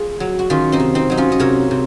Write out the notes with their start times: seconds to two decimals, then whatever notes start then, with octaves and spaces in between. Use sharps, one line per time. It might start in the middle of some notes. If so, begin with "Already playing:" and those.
Already playing: F4 G#4
0.20 F#3
0.39 F#4
0.50 D#3 C#4 F4
0.72 C4 D#4
0.80 C3
0.95 C4 D#4
1.10 F#3 D#4
1.17 C#4 F4
1.32 D#5
1.40 C3 A#4 C#5
1.71 C3